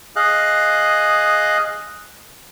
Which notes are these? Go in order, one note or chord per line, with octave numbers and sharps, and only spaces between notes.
G#4 D#5 F5 F#6